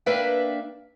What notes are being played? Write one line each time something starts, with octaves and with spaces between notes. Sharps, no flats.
A#3 D4 B4 D5 E5 G5